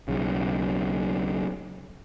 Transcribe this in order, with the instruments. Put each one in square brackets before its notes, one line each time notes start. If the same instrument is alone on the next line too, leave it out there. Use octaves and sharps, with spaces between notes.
[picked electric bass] B1 C#3